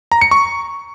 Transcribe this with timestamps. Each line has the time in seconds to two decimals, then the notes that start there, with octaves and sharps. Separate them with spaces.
0.12 A#5
0.21 C#7
0.31 C#6